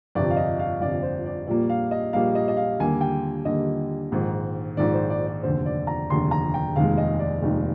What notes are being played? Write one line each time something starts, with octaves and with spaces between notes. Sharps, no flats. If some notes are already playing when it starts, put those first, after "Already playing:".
G1 F2 C3 D5
F5
D#5
F5
G1 F2 C3 D5
C5
D5
A#1 A#2 G3 A#3 D5
F5
D#5
A#1 A#2 G3 A#3 F5
D#5
D#5
F5
D#2 D3 G3 A#3 G#5
G5
D#2 D3 G3 A#3 D#5
A#1 G#2 D#3
A#1 G#2 D#3 D5
C5
D5
D5
F1 D#2 D3 C5
D5
A#5
F1 D#2 D3 C6
A#5
G5
F1 D#2 D#3 G#3 F5
D#5
D5
F1 D#2 D#3 G#3